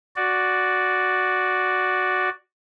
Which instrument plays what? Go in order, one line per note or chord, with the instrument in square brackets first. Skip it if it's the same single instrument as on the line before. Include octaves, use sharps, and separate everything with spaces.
[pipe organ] F#4 D5